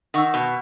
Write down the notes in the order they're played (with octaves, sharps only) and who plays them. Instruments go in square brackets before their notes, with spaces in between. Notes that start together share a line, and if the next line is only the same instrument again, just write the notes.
[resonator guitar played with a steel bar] D#3 [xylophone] F#5 C#6 E6
[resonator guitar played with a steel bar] B2